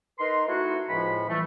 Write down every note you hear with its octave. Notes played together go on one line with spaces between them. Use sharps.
D#4 A#4 B4 A#5 C6
A3 D#4 E4 F#4
C#2 A2 F3 F4 B5
E3 G3 A3